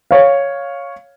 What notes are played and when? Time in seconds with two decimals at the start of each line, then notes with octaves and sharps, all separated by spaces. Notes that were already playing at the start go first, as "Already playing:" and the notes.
0.11 C#5 F5